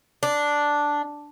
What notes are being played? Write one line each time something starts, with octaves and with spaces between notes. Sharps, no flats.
D4